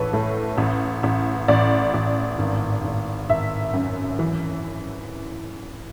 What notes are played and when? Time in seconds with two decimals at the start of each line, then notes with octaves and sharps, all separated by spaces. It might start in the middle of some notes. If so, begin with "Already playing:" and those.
Already playing: A1 E3 A4 B4 C#5
0.13 A2
0.58 A1
1.03 A1
1.48 A1 D5
1.94 A1
2.39 G#1
2.84 G#1
3.30 G#1 E5
3.74 F#2
4.19 E3